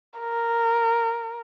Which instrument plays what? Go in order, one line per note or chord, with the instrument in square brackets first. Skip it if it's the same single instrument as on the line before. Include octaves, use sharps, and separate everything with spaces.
[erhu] A#4